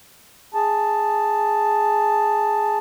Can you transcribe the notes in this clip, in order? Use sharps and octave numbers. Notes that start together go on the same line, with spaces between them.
G#4 A5